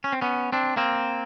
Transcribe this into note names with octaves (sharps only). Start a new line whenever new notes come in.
C#4
C4
B3 C#4
C4 D4
A#3 C4